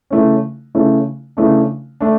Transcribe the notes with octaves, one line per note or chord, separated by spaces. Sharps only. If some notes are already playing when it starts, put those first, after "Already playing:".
C#3 E3 A3 C#4
C#3 E3 A3 C#4
C#3 E3 A3 D4
A3 D4